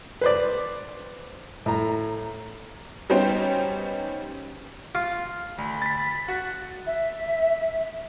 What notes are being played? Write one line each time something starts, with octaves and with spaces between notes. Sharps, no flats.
B4 C5 D5
A2 A#5
G3 B3 C#4 D#4 C5 G5
F4
D2 B5
A6 B6
F#4 F#5
E5